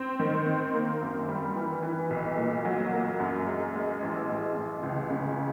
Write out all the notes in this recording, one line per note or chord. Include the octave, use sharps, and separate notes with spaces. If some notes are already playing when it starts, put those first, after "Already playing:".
Already playing: C4
D#3
C4
A#3
F#2
G3
E3
E3
B1
A#2
F#3
A#3
F#2
G#3
G#3
A1
A1
A1
C#2
C#3